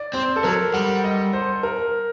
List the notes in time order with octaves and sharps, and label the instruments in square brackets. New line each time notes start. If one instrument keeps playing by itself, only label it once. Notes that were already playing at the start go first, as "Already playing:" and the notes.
Already playing: [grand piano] D5
[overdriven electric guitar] C4 [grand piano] C5
[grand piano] A4
[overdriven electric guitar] F#3 [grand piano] A#4
[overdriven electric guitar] G3 [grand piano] F#5
[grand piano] D#5
C5
A#4